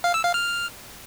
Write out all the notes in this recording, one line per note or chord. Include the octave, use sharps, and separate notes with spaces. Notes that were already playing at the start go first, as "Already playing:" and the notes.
F5
E6
F5
F6